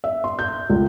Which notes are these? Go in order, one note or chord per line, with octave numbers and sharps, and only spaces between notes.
E5
C6
G6
C#2